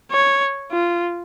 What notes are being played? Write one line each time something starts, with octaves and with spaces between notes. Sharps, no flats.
C#5
F4